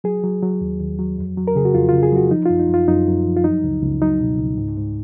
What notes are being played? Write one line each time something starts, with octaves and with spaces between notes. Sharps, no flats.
F#3 G#4
F#3
F#3
D#2
D#2
F#3
F2
F#3
A#4
C#3 G#4
F#4
F2 F4
C#3 F4
G#4
F#3 F#4
F3 D#4
F#2 F4
D#4
F#2 F4
F#2 D#4
F#2
F3
F4
F#3 D#4
C#2
C#2
F#3 D#4
B2
C#2
G#2
G#2